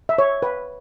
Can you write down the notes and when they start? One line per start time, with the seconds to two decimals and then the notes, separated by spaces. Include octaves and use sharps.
0.09 E5
0.18 C#5
0.42 B4